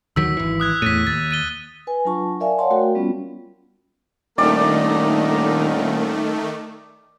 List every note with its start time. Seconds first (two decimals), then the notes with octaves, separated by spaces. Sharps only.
0.16 D2 D#3 F#3 E6 B6
0.37 G#1 E3
0.60 D#6 F#6 G#6
0.82 E2 A2 B6 D#7
1.07 D#2 A6
1.31 A6 D#7 G7
1.87 B4 G#5
2.05 F#3 D4 F4 A5 C#6
2.40 A#4 D5 E5 F5 G#5
2.59 C#5 D5 F5 F#5 A5 C6
2.70 A3 F#4 A#4 G5
2.95 G3 B3 C#4 F4
4.38 D#1 D#3 A3 A#3 D4 D#4 D5